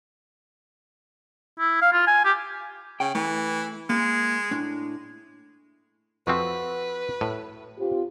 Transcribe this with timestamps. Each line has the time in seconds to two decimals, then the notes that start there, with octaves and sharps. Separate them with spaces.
1.60 E4
1.82 F5
1.93 F4
2.07 G#5
2.25 G4
3.00 C#3 G5
3.15 E3 A3
3.89 G#3 A#3
4.51 A2 D4
6.27 F2 F3 C4 F#4 B4 E5
7.21 A2
7.78 C4 F4 G4